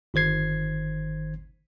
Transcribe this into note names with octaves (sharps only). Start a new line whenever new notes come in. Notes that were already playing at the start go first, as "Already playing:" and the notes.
G1 D#3 C5 G#6 C7